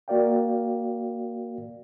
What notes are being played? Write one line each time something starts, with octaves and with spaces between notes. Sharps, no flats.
A#3 F#4 A#4 D5 F5 G5